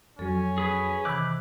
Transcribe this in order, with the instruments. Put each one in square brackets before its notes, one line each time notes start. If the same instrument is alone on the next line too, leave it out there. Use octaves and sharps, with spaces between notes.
[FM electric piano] F2 F#3 [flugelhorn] C#4 [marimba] A4
[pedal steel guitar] G#4 B4
[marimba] C3 D#3 E3 [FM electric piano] B5 F#6 [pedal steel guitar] D6